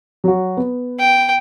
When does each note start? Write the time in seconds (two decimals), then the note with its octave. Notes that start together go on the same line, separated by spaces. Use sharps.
0.24 F#3 F#4
0.57 B3
0.99 G5